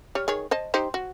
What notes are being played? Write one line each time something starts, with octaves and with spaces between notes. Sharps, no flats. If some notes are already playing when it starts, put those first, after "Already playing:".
G3 C#5
D#3 G#4 C#5
C5 D#5 A5
D#4 G4 C5
F#4